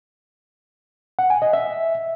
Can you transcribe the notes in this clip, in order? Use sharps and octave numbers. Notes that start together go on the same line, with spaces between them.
F#5
G#5
D#5
E5